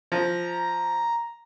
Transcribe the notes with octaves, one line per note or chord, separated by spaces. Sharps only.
F3 A#5